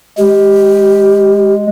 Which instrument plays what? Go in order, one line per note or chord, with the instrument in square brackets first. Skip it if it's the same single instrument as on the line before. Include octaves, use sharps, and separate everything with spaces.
[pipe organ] G#3 [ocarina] G4